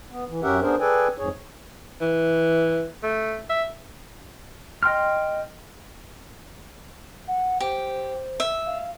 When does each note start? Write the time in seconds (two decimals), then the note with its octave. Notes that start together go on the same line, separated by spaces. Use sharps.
0.10 B3
0.28 E3
0.43 F#2 C#4 G4 A#4 E5 F#5
0.61 B3 D4 G#4 A#4 C5
0.80 G#4 A4 B4 D5 G5 G#5
1.18 F2 G#2 G#4 C#5
2.01 E3
3.03 A3
3.50 E5
4.83 D#5 G5 C6 F6
7.27 F#5
7.60 G4 C5
8.40 E5
8.66 F5